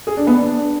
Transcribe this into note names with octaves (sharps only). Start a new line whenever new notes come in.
G#4
D4
B3
D4